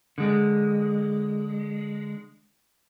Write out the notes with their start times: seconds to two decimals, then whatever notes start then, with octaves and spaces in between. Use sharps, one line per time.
0.18 D3 G#3